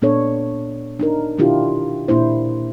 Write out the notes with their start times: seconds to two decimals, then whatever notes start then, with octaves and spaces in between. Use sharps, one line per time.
0.02 A#2 B3 D4 A4 C#5
1.00 D4 D#4 A#4
1.38 B2 D#3 D4 E4 F4 G4
2.08 A#2 A#3 D4 E4 C5